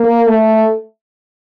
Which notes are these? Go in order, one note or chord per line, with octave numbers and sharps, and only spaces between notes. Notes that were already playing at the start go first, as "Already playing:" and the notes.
Already playing: A#3
A3